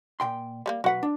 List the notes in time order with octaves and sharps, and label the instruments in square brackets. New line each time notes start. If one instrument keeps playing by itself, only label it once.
[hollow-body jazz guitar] A#2 G5 C6
[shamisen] G3 A3 A#3
[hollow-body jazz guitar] B1 B4 [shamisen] F#4 F#5
[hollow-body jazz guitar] D4